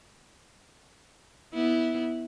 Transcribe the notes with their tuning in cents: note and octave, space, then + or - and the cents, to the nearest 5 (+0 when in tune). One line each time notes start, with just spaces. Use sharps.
B3 +0 E4 -15